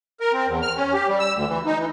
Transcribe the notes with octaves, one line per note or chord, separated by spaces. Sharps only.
A#4
C4
E2
F6
C#4
G4
G3
E6
D2
E3
D#4
E3